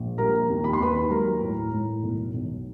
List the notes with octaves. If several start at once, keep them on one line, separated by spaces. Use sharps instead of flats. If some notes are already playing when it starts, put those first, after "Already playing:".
Already playing: A#1
G3 A#4 A#5
D#2
B5
C6
D#2 B4 B5
F#3 A#4 A#5
A2
A2
B1
B1